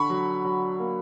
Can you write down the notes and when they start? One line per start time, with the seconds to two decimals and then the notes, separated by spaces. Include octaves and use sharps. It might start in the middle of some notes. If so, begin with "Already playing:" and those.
Already playing: D3 B5 C#6
0.10 F#3
0.45 F#3
0.79 A#3